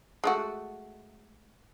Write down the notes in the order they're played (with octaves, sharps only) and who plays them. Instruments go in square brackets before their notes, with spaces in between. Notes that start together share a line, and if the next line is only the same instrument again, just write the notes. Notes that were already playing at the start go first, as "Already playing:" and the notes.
[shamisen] G#3 A3 F#4